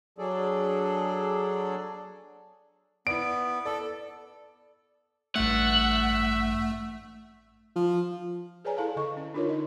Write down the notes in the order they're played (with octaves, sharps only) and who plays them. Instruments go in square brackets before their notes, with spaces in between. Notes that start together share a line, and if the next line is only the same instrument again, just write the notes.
[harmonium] F#3 D4 G#4 A4 D5
[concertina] B3 [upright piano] E4 D5 [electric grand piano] D7
[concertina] A4 [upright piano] D5
[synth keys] A1 G2 A6 [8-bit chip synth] A3 [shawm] E5 [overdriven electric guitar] F#5
[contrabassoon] F3
[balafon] G#4 B4 C#5 D5 G#5 A#5
E4 A4 F5 A5
D3 D#5 C#6
C#4
D4 D#4 F4 A#4 C#5
D#4 D#5